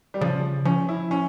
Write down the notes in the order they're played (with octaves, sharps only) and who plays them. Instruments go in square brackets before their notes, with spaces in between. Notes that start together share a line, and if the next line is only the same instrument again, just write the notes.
[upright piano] G3
[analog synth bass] C#3 [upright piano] F3
[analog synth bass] F3 [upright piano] C#4
[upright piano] E4
C#4